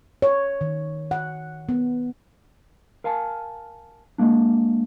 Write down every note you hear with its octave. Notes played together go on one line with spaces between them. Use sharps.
C#5
D#3
F#5
B3
A#4 F5 G#5 A5
G#3 A#3 D4